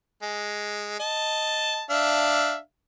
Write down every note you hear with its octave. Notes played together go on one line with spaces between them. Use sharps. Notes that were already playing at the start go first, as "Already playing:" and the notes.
G#3
D#5 A5
D4 E5 F5